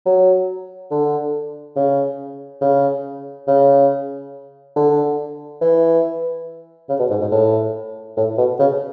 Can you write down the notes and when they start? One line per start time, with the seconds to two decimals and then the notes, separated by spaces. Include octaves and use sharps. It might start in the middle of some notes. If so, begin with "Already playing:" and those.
0.06 F#3
0.91 D3
1.76 C#3
2.61 C#3
3.48 C#3
4.76 D3
5.61 E3
6.89 C#3
6.99 B2
7.10 G#2
7.21 G#2
7.31 A2
8.17 A2
8.38 B2
8.59 C#3